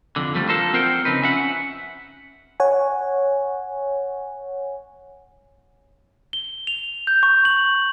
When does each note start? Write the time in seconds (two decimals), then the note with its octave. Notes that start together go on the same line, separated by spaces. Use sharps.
0.16 F2 D3
0.35 D3 F3 G3 A3
0.49 D3 F3 A4 A#4 C5
0.73 C4 F4 A#4 C5 F#5 G5
1.05 C#3 F3 C4 D#4 B4
1.22 C#4 E5 F#5
2.60 C#5 F#5 G#5
6.33 G7
6.67 F7
7.07 G6
7.23 C#6
7.45 F#7